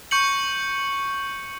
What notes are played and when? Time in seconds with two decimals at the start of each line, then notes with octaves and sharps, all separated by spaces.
0.11 C#6 G6 C#7 F#7